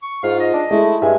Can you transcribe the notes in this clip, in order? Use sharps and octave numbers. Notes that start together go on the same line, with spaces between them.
C#6
G#2 F4 F5
D#5
D4
G#3 A3 E4
G2 G#3 G#4 E5 G#5